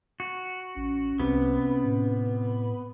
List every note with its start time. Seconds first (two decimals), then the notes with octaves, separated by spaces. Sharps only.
0.20 F#4
0.77 A1 C#4
1.20 C2 C3 B3
1.85 A2